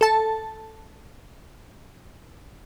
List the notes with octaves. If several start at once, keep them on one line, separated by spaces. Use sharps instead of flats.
A4 A5